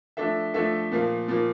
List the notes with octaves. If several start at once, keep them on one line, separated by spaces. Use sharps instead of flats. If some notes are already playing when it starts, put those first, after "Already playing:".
F3 A3 D4 A4 E5
F3 A3 D4 A4 E5
A#2 F3 A#3
A#2 F3 A#3